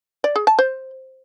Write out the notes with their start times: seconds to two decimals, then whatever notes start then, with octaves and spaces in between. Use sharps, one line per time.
0.24 D5
0.36 G#4
0.47 A5
0.59 C5